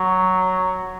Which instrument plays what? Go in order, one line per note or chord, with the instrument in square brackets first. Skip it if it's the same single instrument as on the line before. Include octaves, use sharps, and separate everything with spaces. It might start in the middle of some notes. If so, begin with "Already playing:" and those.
Already playing: [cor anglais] F#3